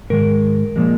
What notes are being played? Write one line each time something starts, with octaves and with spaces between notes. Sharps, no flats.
G#2 D#3 G#3 A#4
A#2 F3 G#3